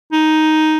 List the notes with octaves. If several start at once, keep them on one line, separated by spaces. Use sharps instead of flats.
D#4